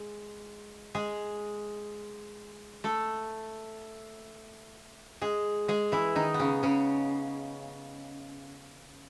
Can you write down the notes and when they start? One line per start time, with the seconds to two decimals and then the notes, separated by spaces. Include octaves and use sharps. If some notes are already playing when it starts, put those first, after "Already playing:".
Already playing: G#3
0.95 G#3 G#4
2.84 A3 A4
5.21 G#3 G#4
5.68 G#3 G#4
5.92 E3 E4
6.15 D#3 D#4
6.34 B3
6.39 C#3 C#4
6.63 C#3 C#4